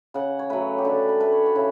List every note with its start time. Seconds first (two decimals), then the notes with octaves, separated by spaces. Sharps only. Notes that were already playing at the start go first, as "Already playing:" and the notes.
0.14 C#3 F#5
0.39 C#5
0.49 F#3 A3 B4
0.78 G4
0.85 D3 A4
1.09 B4
1.20 A3 B4
1.32 C#5
1.46 F#4
1.55 C#3 E4